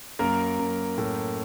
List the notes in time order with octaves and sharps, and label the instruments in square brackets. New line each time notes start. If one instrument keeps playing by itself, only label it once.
[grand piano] F#2 A#3 A#4
F#2
A2